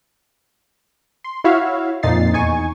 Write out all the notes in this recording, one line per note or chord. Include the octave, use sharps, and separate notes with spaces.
C6
E4 F#4 C#5 E5 F5
F2 A#2 D#4 A6 C7
E2 D#4 G#5 C#6